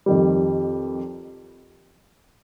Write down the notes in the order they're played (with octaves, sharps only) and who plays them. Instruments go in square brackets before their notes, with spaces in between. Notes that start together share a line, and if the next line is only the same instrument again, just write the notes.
[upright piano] F2 D#3 G3